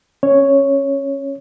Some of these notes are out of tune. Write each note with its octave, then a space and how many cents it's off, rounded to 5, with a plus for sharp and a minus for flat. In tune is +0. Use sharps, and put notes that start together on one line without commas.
C#4 -20 C#5 +0